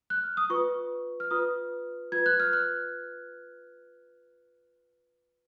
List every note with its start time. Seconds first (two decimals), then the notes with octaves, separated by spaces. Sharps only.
0.10 F#6
0.23 F6
0.37 D#6
0.50 F4 B4 C#6
1.20 F6
1.31 F4 B4 D#6
2.12 F4 B4 G#6
2.26 F#6
2.40 F6
2.53 F#6